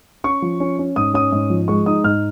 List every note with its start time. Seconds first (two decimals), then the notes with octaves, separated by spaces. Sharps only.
0.24 C#4 C#6
0.42 F3
0.60 C#4
0.79 C#4
0.96 G#2 D#6
1.14 C#4 D#6
1.32 G#2
1.50 F3
1.68 G#3 C#6
1.86 D#4 D#6
2.04 G#2 F6